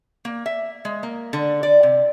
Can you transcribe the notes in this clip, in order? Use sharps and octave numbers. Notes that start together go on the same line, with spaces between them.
A#3
E5
G#3
A#3
D3
D5
C3